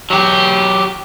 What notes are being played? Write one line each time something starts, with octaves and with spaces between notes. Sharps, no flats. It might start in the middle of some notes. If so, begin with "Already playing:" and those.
F#3 G4